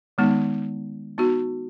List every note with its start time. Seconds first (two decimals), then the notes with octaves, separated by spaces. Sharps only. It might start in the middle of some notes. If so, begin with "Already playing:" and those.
0.18 D#3 G#3 B3 D#4
1.18 B3 D#4 F#4